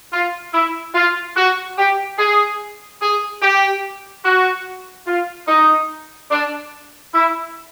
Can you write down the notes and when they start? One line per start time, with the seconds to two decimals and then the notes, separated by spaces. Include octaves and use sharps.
0.13 F4
0.54 E4
0.95 F4
1.37 F#4
1.78 G4
2.19 G#4
3.02 G#4
3.42 G4
4.25 F#4
5.07 F4
5.48 D#4
6.31 D4
7.14 E4